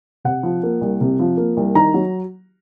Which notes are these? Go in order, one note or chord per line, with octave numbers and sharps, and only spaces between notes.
C3 F#5
F3
A#3
C2
C3
F3
A#3
C2
D#3 A#5
F#3